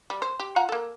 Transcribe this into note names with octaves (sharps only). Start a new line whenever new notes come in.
G3
C5
G4
F4 F#5 A#5
A#3 A4